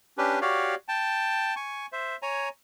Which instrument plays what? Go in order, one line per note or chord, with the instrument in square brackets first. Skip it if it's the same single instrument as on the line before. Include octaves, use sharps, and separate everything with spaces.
[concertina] C#4 D4 G4 B4
F#4 G4 C#5 D5 F5
G5 A5
G#5 C#6
C5 E5
C#5 G#5 A#5